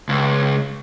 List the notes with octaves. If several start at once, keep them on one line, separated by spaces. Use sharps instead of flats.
C#2